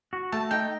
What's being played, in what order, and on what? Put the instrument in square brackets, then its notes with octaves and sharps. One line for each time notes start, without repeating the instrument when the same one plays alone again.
[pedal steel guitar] F#4
[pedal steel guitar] A3 [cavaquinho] A5
[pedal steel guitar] D#4 [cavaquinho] G5